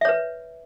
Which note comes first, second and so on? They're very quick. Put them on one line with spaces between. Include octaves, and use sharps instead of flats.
E5 C#5 B4